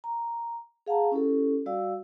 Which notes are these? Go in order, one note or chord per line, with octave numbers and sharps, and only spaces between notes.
A#5
G#4 F5 F#5 A5 A#5
C#4 E4 G4 A4
G3 F#4 D5 F5 E6